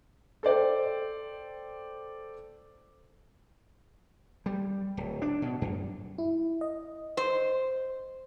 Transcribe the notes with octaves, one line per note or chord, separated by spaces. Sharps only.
A4 C5 D5 G5
G3
D1
D4
B2
F#2
E4
D#5
C5